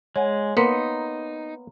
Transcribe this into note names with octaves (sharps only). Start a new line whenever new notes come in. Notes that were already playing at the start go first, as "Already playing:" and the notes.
G#3 C#5 F#5 G#5
A#3 B3 D#4 C6 B6 C#7